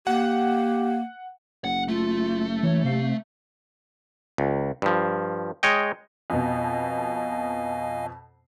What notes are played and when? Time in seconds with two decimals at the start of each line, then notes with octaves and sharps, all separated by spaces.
0.07 A#3 G4 F#5
1.64 F#1 F#5
1.88 A3 F4
2.63 E3 C#5
2.84 C3 F5
4.38 C#2
4.82 G2 F3
5.63 G#3 C#5 D#5 G5
6.30 F2 B2 D#5 F5 G#5